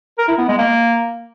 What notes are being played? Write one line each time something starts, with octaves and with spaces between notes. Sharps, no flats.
A#4
E4
B3
G#3
A#3